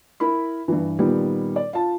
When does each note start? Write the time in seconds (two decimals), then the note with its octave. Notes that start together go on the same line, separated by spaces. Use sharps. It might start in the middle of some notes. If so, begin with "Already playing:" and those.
0.20 E4 A#4 B5
0.68 G2 E3
0.98 A#2 D#3 G3 B3
1.56 D5
1.73 F4 A5